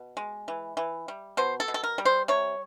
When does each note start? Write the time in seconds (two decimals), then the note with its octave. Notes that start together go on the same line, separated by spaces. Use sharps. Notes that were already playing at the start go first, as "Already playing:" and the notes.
Already playing: B2
0.17 G#3
0.48 E3
0.77 E3
1.08 G3
1.37 B2 C5
1.60 A4
1.68 B2
1.74 A4
1.83 A#4
1.98 G3
2.05 C5
2.28 C3 C#5